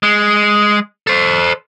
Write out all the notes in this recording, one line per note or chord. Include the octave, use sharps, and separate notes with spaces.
G#3
A4 C5